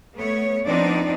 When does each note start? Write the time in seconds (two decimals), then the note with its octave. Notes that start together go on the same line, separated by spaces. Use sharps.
0.16 A3 B3 C#5
0.66 F3 B3 C4 D4 D#4 D5